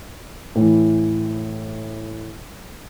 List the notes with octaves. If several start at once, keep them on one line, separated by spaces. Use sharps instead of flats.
A2 E3